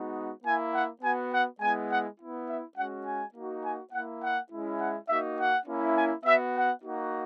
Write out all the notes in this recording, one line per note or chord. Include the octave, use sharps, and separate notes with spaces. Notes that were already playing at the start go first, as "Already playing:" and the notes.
Already playing: G#3 B3 D#4 F#4
A#3 E4 G#5
F#5
B3 F#4 G#5
F#5
G#3 B3 E4 G#5
F#5
B3 E4
E5
G#3 C#4 F#4 F#5
G#5
A#3 D#4 F#4
G#5
A#3 E4 F#5
F#5
G#3 C#4 E4
F#5
A#3 D#4 F#4 E5
F#5
A#3 C#4 E4
G#5
B3 F#4 E5
F#5
A#3 D#4 F#4